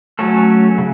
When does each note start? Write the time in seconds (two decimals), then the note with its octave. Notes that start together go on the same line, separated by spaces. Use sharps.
0.19 F#3 A3 C#4 A4
0.78 C#3